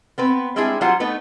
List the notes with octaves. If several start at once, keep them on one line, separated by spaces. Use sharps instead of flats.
B3 C4 B4
G3 G#3 C4 D4 E4 G#4
F#3 G3 F4 C5 F#5
A3 B3 D#4 B4